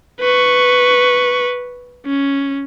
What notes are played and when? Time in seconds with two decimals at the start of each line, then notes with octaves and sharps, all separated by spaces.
0.20 B4 C#6
2.06 C#4